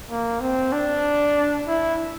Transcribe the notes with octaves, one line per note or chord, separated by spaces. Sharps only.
A#3
C4
D4
E4